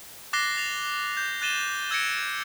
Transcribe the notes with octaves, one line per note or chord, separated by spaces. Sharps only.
D6 F#6 A6 A#6 C7 G7
A6 F7
G6
F#6 A6 D#7 E7 G7
E6 G#6 A#6 C#7 D7